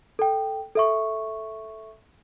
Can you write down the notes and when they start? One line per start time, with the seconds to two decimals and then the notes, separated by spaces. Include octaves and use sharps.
0.19 A4 G5
0.75 A4 E5 C#6